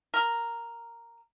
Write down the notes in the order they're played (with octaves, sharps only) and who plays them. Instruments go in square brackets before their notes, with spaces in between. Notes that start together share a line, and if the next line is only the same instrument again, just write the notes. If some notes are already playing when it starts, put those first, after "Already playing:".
[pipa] A#4